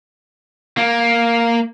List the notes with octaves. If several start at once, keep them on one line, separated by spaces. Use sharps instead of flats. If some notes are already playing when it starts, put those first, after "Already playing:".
A#3